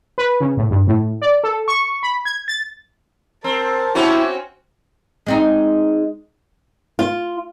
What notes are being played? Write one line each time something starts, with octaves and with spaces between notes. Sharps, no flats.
B4
C#3
A2
G2
A2
D5
A4
C#6
B5
G#6
A6
C4 A#4 A5
C4 C#4 E4 F#4 G4
G#3 C4 D#4
F4